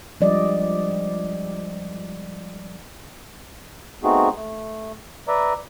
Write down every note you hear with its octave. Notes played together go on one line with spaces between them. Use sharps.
F3 G3 G#3 D5 D#5
A3 B3 C4 D#4 F#4 G#4
A3
B4 D5 E5 A#5